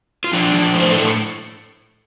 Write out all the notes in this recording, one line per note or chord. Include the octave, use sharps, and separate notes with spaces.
F4
F3 D4
F3
A2
C5
A2 A4